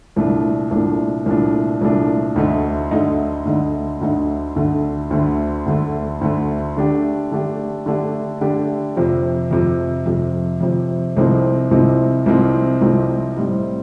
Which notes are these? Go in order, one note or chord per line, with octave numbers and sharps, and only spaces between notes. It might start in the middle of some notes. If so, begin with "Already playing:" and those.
C2 A#2 A3 D4
C2 A#2 A3 D4
C2 A#2 A3 D4
C2 A#2 A3 D4
D2 D3 A3 D#4
D2 D3 A3 D#4
D2 D3 A3 D#4
D2 D3 A3 D#4
D2 D3 A3
D2 D3 A3
D2 D3 A3
D2 D3 A3
D3 A3 D4 G4
D3 A3 D4 G4
D3 A3 D4 G4
D3 A3 D4 G4
F2 C3 F3
F2 C3 F3
F2 C3 F3
F2 C3 F3
C2 C3 F3 C4 D#4
C2 C3 F3 C4 D#4
C2 C3 F3 C4 D#4
C2 C3 F3 C4 D#4
A2 G3 C4 D#4